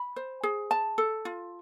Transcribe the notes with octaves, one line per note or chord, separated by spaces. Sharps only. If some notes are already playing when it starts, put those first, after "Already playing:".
Already playing: B5
C5
G#4
A5
A4
F4